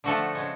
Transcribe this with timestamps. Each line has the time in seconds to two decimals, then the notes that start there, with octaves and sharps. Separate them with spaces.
0.04 D3 F3 A3 F#4 A4
0.35 C#3 G#3